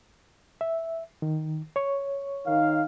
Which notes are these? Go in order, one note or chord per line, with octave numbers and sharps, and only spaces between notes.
E5
D#3
C#5 C#6
D#3 F5